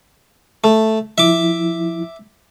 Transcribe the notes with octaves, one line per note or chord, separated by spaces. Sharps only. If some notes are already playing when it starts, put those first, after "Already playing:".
A3
F3 E4 E5 D6